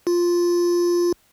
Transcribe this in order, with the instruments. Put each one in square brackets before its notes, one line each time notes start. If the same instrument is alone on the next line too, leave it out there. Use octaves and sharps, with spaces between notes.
[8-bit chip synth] F4